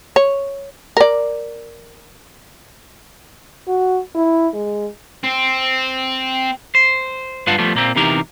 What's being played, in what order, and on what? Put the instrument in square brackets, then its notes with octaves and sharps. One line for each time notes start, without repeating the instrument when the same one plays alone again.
[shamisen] C#5
A#4 D5
[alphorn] F#4
E4
G#3
[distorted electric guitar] C4
[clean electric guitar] C5
G2 F4 B4 F5 F#5 A5
F3 G3 A3 B3
A#2 A#3 C4
E2 C3 E3 D#4 G4 A#4